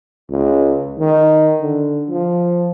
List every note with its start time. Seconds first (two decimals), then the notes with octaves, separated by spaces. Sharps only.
0.30 C#2
0.99 D#3
1.61 D3
2.09 F3